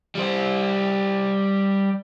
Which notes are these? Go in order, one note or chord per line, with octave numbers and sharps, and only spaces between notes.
G3 C5